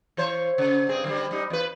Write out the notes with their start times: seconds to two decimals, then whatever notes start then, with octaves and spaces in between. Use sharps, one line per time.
0.17 E3 C5 C#5
0.58 C#3
0.89 G2 C4 G#4
1.04 D3 G3
1.31 G3 D#4
1.50 E2 B4